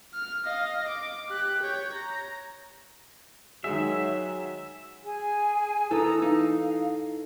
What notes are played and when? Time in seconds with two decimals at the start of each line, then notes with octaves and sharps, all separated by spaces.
0.14 F6
0.45 D#5 F5
0.88 D6
1.30 G4 F#6
1.63 C#5 G6
1.93 A#5
3.64 D#3 F#3 G#3 G#4 E5
5.05 G#4 G#5
5.91 E3 A4 A#5 D#6 E6
6.22 D#4 F5